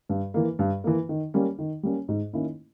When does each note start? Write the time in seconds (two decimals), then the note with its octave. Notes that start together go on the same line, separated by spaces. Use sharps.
0.09 G2
0.34 E3 A#3
0.59 G2
0.84 E3 A#3
1.09 D#3
1.34 G3 A#3 C#4
1.59 D#3
1.83 G3 A#3 C#4
2.09 G#2
2.33 D#3 A#3 C#4 E4